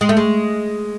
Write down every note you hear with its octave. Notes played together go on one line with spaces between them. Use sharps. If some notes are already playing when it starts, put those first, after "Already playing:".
G#3
A3
G#3